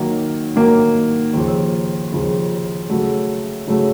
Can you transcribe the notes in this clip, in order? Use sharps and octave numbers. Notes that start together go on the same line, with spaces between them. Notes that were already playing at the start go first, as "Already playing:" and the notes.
Already playing: D#3 F#3 A#3 D#4
D#3 F#3 A#3 D#4
D#2 C#3 F3
D#2 C#3 F3
C#3 F#3 A3
C#3 F#3 A3